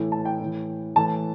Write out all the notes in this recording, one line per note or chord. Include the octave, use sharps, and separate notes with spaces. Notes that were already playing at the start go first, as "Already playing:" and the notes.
Already playing: A2 E3
A5
G5
A2 E3
A2 E3 A5